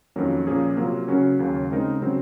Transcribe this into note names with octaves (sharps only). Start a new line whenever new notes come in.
F2 D#3 F#3 A#3 C#4
A#2 F3 A#3 C#4 G#4
C3 F#3 A#3 F4
C#3 F#3 C#4 F#4 A#4
D#2 C#3 F#3 A#3
C#3 G#3 C4 D#4 A#4
C#3 F#3 C4